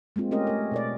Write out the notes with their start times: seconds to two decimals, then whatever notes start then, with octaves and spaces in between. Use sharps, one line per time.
0.16 G#3 A#3 C4 F4
0.31 A3 C#4 G4 A#4 D#5
0.47 A3 A#4
0.71 B2 A#4 D5